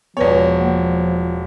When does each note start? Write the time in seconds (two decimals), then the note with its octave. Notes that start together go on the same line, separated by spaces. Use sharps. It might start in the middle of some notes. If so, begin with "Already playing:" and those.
0.17 E1 F3 B3 B4 C#5 D5
0.61 A#3